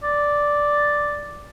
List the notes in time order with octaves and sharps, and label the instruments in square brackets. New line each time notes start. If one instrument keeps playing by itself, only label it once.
[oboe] D5